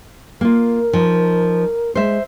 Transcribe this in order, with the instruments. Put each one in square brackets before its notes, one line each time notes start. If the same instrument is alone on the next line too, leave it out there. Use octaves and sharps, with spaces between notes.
[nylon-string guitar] A#3 F4 [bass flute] A#4
[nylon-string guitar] F3 D#4
[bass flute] G#3 [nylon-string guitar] C5 E5